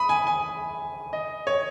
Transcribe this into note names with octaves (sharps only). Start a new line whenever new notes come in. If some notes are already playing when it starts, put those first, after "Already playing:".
Already playing: B5 D#6
G#5
G#5
D#5
C#5